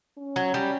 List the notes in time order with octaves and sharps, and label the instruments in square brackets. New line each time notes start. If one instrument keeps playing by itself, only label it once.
[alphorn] C#4
[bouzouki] F#3
G3